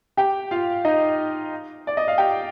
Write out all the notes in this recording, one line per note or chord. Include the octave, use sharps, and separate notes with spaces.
G4 G5
F4 F5
D#4 D#5
D5
D#5
F5
G4 G5